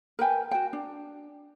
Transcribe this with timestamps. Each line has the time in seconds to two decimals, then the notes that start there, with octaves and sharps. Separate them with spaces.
0.19 A#4 B4 G5 G#5
0.51 F#4 G5
0.73 D4